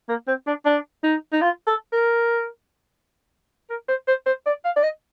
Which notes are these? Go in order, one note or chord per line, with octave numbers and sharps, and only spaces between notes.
A#3
C4
D4
D4
D#4
D#4
F4
A4
A#4
A#4
C5
C5
C5
D5
F5
D5
D#5